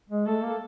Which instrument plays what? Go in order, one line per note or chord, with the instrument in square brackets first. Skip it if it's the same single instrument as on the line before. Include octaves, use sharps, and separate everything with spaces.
[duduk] G#3
[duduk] A3 [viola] A4
[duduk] A#3